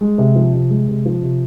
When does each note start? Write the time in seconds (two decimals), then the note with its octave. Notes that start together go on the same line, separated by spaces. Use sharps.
0.01 G#3
0.18 C3
0.35 F3
0.54 C3
0.70 G#3
0.88 C3
1.06 F3
1.23 C3